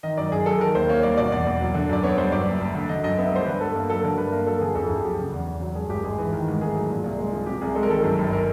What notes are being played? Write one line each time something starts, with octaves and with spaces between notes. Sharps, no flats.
D#3 D#5
F#2 D5
F#2 G#4
F#3 A4
D#3 A#4
D#2 C5
A#3 C#5
G3 D5
B2 D5
E2 D5
E2
F#3
D3
F#2 D5
B3 C#5
G3 C5
F#2 D5
F#1
F#1
D3
D3 D#5
F#2 D#5
B3 E5
G3 C5
D3 B4
G2 A4
A#3
F#3 A4
D3 A#4
G2 B4
A#3 A#4
F#3 A4
D3 G#4
F2 A4
F2 G#4
F#3 G4
C#3
E2
E2
F#3
G2 G#4
G#1 G4
G#3 G#4
E3
D#3
G#2
A3 G#4
F#3
A#2
C2
G#3
F3
C3 G4
C2 G#4
G#3 A4
A#4
D#3 A4
F#2
G1
A#4